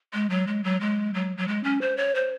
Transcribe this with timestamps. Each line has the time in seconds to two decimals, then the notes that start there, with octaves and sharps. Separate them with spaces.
0.14 G#3
0.30 F#3
0.47 G#3
0.64 F#3
0.81 G#3
1.14 F#3
1.37 F#3
1.48 G#3
1.64 C#4
1.81 C5
1.97 C#5
2.15 C5